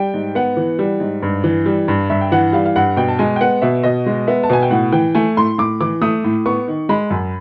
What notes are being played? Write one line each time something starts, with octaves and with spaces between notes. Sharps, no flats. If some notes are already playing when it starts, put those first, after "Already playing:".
Already playing: G3 G5
G#2
B3 F#5
E3
G3
G#2
G2
E3
G3
G2
G2 E5
G5
E3 F#5
G3 F5
F5
G2 F#5
B2 G5
A5
G#3 G#5
G5
B3 F#5
B2 E5
B2 D#5
G#3
B3 E5
A5
B2 G#5
G5
A2 F#5
E3 G5
A3 G#5
A2 C6
A2 D6
E3 D6
A3 D#6
A2
B3 C#6
D#3
G#3 B5
F#2